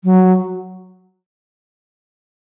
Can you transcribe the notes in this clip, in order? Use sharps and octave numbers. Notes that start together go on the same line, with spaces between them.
F#3